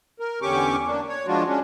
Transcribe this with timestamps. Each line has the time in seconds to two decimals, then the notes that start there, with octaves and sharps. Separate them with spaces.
0.20 A#4
0.42 E2 D3 C#4 G4 C#6 D6
0.87 A#3 D4
1.08 C#5
1.27 F3 G#3 D4 F4 F#4
1.48 G#3 C#4 D4